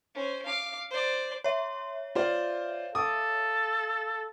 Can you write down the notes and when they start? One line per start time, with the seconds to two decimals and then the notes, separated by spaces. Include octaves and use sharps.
0.15 C#4 C5
0.46 F5 D6
0.91 C5 D5
1.44 C#5 E5 C6
2.15 F4 C5 D5 F5
2.95 A4 D6 D#6